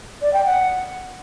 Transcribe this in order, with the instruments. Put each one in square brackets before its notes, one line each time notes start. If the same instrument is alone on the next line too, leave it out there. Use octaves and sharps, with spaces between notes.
[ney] D5
G5
F#5